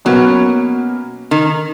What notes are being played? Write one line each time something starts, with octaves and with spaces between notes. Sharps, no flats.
B2 F#3 A#3 C#4 F#4 B4
D#3